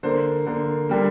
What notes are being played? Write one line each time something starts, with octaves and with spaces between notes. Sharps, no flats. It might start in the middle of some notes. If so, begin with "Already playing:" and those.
D3 A#3 C5
D3 A#3
D3 G3 A#3